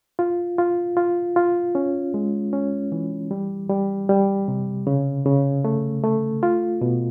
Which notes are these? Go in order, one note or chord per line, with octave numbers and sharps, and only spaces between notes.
F4
F4
F4
F4
C#4
G#3
C#4
E3
G3
G3
G3
C3
C#3
C#3
A3
A3
F4
B2